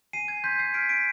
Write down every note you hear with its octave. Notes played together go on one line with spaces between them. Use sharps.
G#5 C7 D#7
G#6
C6 G6 B6
G#6 C7
F6 B6 D7
B6 D7